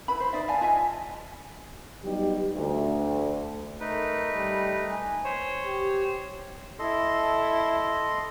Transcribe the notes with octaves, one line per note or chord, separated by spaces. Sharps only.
E4 B4 B5
C5
D#4 D5 E5
D5 F5 G#5 A5
F4 D#5 E5 G#5
F#3 G3 B3 D#4 G4
D2
A3 D#4 A#4 B4
G3
G#5
C5 C#5
G4
E4 A4 D#5 C6